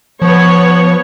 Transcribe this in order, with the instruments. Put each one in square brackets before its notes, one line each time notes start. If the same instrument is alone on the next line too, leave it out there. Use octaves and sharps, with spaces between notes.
[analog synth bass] F3 [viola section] B3 C#5